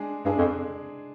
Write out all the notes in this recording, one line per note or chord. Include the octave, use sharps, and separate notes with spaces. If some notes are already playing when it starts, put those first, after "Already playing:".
Already playing: G#3 D4 G#4
G2 G#3 D4 G#4
F2